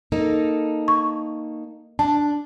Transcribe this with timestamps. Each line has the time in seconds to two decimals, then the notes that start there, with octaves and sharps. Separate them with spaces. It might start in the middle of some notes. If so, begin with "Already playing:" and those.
0.12 A#3 D#4 A4
0.88 C#6
1.99 D4 A5